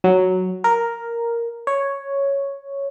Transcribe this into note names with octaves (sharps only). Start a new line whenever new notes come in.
F#3
A#4
C#5